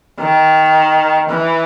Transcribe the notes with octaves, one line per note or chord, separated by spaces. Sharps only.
D#3
E3